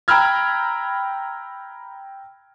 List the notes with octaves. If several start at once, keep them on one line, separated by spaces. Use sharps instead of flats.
G5 A#5 B5 E6 F6 G#6